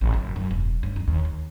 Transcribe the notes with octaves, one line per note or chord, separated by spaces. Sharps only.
A1
F#1
F#2
E1
G2
F2
D#2
D#2